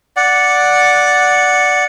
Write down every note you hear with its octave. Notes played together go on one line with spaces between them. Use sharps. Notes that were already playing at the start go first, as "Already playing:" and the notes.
D5 F#5